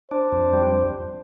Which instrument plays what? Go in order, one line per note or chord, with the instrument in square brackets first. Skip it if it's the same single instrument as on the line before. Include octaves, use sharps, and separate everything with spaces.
[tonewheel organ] D4 [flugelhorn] C5
[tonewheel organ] F2
G3